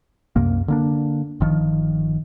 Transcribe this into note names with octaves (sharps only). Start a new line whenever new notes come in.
C2 F#2 C3 A#3
D3 A#3 D4
G1 D#3 F3